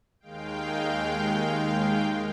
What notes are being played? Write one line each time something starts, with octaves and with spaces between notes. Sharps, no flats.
D#2 D#3 G#3 F5 G5